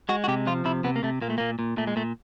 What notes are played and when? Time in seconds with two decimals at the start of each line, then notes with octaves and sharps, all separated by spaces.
0.09 G#3 F#4
0.24 F#4
0.28 C3 G4
0.47 F3 F4
0.65 C3 E4
0.84 C3 B3
0.96 A#3
1.03 C3 A3
1.22 A#2 A#3
1.30 A3
1.38 A#2 A#3
1.59 A#2
1.77 A#2 A3
1.87 G#3
1.96 A#2 A3